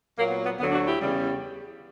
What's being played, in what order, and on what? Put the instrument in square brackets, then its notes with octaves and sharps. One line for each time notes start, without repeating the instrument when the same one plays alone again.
[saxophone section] A#2 F#3 A#3
B3
B3
D2 B3
D3 F#3
D4 F#4
E4 G4
E2 C#3 G3